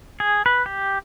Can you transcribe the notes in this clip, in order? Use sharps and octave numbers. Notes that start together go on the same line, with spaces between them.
G#4
B4
G4